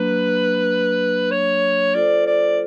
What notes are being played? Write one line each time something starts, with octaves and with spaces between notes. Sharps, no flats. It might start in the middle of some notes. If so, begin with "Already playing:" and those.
Already playing: F#3 A#3 D4 B4
C#5
F4 A4 C5 D5
D5